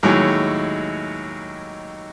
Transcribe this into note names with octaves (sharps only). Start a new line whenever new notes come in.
D#2 A2 F#3 G#3